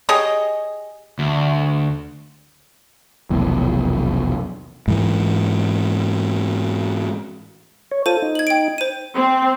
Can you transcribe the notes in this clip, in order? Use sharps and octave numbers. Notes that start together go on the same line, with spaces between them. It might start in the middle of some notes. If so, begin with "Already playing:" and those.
G4 G#4 C#5 D#5
D2
F1 B1 E2
G#2 E3
C#5
F4 A4 C5 D#7
D#4
G#6 F#7
G5 D7
C5 D#7
C4